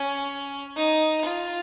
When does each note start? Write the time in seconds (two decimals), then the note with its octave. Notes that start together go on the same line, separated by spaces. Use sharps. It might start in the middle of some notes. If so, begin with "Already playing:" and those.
Already playing: C#4
0.76 D#4
1.26 F4